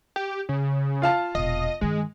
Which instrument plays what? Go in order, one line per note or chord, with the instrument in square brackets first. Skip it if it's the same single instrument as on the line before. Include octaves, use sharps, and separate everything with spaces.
[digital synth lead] G4
C#3
[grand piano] F4 F5 A5
[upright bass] E1 A#2 [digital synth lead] D#5
[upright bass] G2 D#3 [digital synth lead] G#3